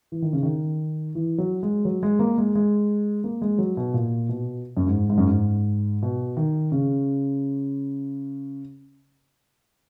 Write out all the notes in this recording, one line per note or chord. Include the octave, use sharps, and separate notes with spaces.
E3
D#3
C#3
D#3
E3
F#3
G#3
F#3
G#3
A#3
G#3
G#3
A#3
G#3
F#3
B2
A#2
B2
F#2
G#2
G#2
F#2
G#2
B2
D#3
C#3